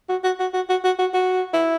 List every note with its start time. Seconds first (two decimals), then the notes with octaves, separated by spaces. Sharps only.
0.09 F#4
0.24 F#4
0.40 F#4
0.53 F#4
0.69 F#4
0.84 F#4
0.99 F#4
1.14 F#4
1.53 E4